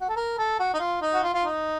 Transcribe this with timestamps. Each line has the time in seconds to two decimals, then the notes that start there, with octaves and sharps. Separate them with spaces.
0.01 F#4
0.09 A4
0.16 A#4
0.38 A4
0.59 F#4
0.74 D#4
0.80 F4
1.02 D#4
1.14 F#4
1.23 F4
1.34 F4
1.44 D#4